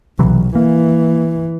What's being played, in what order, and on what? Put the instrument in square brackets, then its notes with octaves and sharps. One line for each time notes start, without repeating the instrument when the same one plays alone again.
[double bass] B1 [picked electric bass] C3 E3 F#3
[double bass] E3 [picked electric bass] A#3